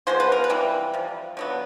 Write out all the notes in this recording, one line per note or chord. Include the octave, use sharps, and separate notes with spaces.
F3 G#3 B3 C5
B4
A#4
B4
C3 E3 G3
C3 F3
D3 F#3 B3